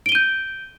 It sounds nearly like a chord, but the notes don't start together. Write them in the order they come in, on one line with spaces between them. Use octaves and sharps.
D7 G7 D#7 G6